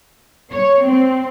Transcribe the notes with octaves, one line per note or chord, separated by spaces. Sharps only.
C#5
C4